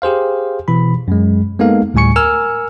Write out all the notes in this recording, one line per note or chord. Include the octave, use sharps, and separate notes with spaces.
G4 G#4 C5 F5
B2 E3 B5
F#2 G#3
G#3 A#3 B3 D#4 A4 F5
D2 A2 G3 G#5 C#6 C#7
A#4 G#5 E6 F6